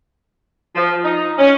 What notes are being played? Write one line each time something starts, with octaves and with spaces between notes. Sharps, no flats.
F3
D#4
C#4